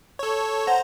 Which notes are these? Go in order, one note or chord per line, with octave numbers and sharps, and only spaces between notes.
A4 C#5
C5 F#5 A#5